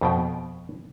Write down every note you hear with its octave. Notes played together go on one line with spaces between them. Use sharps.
F2 B2 G5